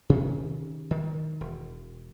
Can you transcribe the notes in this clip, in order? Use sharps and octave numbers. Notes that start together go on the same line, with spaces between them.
C3 D#3 C#4
D#3
E1